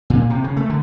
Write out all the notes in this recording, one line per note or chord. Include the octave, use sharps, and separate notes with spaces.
A#2
C3
C#3
A3
D3